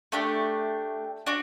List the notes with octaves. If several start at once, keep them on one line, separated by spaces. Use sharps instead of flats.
A3 D4 G4
D4 F#4